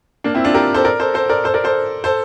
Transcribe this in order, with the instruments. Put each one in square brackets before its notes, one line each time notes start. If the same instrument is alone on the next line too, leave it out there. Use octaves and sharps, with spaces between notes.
[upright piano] A#3 D4
C4 E4
D4 F4
G4 A#4
A4 C5
A#4 D5
A4 C5
A4 C5
A#4 D5
A4 C5
A#4 D5
A4 C5
A4 C5